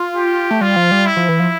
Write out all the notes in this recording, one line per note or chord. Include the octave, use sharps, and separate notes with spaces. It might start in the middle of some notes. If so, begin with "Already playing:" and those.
Already playing: F4
G4
A3
G3 F4
F3
G3
E4
F3
E3
F3